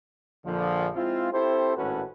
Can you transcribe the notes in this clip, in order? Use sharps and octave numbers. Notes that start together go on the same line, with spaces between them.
A#1 D3 F3
G#3 C4 E4 F4
C4 E4 G4 A4 C5
G#1 A2 A3 C#4 F#4 B4